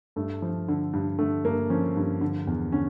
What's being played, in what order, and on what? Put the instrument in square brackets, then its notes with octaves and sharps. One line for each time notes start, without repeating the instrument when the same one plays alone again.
[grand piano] G2 A3
F3
D3
G2
D3 A3
G2 A#3
F3 C#4
G2
D3
E2
D3 C#4